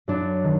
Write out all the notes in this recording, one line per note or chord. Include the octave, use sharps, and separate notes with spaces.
F#2 D4
D#3